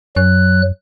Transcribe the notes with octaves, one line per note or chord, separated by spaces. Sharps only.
F#2 F#3 F#6